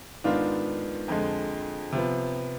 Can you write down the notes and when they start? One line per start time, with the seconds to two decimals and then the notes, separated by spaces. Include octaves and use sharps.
0.24 G#2 D#3 B3 D4 F4
1.08 F2 D3 G#3
1.92 C3 F3 B3